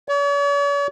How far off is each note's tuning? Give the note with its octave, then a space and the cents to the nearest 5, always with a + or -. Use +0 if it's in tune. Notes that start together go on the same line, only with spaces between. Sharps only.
C#5 +45